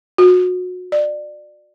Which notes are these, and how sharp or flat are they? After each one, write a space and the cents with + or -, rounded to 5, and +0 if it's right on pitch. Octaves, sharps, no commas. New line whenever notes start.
F#4 -30
D5 +20